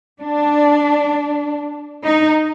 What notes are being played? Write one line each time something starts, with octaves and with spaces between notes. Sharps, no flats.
D4
D#4